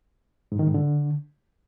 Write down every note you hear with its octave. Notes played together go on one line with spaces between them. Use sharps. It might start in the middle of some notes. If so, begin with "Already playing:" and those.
G#2
D#3
G#2
D3